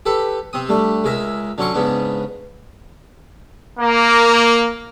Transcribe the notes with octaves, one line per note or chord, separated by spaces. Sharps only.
G4 A4 B4
C3 C4 D#6
G3 A3 D4
C#2 G#3 A#4 E5
D3 F#3 C#4 C6 C#6
G#2 C#3 B3 D4
A#3